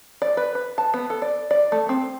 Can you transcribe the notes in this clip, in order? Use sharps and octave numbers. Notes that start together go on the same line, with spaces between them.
D5
B4
B4
A5
B3
A4
D5
D5
A3
C4